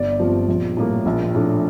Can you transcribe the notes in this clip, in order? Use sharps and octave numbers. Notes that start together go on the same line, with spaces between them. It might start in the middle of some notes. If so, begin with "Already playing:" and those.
Already playing: G1 D5
G2 F3 C4
A#1
A2 G3 A#3
A#1
A2 A3 D4